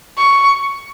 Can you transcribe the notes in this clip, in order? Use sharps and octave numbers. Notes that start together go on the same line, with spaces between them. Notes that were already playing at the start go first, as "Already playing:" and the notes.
C#6